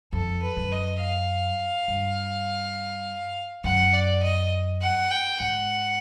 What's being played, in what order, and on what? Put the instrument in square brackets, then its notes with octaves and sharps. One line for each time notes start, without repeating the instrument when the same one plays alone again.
[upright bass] F2 [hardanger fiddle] A4
[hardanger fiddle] B4
[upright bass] F#2
[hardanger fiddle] D#5
F5
[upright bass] G2
[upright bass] F#2 [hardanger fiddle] F#5
[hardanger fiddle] D5
D#5
F#5
G5
[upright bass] G#2 [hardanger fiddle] F#5